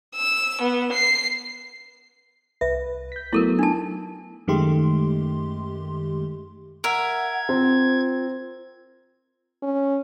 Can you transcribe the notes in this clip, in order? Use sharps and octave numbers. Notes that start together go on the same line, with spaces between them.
E6
B3
C7
C2 B4 E5
G6 B6
F#3 A3 B3 E4 A4 A#4
D4 D#4 A5
F#2 D#3 G#3 A3 G4 C6
A#4 E5 F#5 G#6
C4 F4
C#4